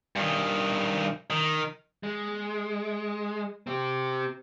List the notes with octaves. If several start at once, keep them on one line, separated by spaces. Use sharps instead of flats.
G2 D#3
D#3
G#3
C4 G4